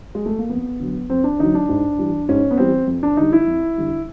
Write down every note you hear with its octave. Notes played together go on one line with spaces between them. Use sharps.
G#3
A3
A#3
F2 B3
D3 F#3
F2 C4
D4
D3 F#3 D#4
D4
G#2
E3 G3
G#2 C#4
B3
E3 G3 C4
F2
D4
D3 G3 D#4
E4
F2
D3 G3